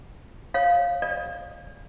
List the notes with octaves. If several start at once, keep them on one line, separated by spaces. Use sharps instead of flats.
C#5 F5
D5